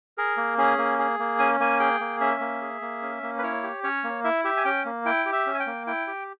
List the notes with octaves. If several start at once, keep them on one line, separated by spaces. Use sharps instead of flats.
G#4 A#4
A#3
C#4 G#4
A#3
G#4
A#3
C#4 G#5
A#3 G#5
G#4 G5
A#3
C#4 E5
A#3
G#4
A#3
C#4
A#3
B4
E4 C#5
G4
C#4 C#5
A#3
E4 E5
G4 E5
G#5
C#4 G5
A#3
E4 G5
G4
E5
C#4
G#5
G5
A#3
E4 G5
G4